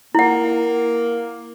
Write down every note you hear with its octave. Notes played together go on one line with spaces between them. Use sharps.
A#3 E4 F#5